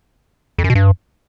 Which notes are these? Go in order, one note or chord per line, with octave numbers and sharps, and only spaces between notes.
F2
F#2
B2
G2